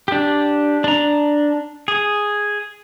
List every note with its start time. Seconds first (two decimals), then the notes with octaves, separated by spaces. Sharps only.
0.08 D4 G4
0.84 D4 A#5
1.88 G#4